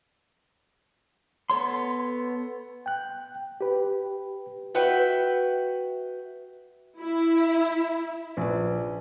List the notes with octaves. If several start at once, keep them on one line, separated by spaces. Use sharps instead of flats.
B3 A4 C#5 C6
G5 F#6
G4 B4
F#4 B4 E5 G5
E4
A#1 B4